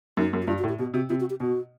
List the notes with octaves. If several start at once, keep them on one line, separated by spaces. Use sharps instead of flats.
F#2 D#4
F#2
F#4
G2 F4
F#4
A2
G4
B2 G4
C3 F#4
C3 F4
F#4
G4
B2 F#4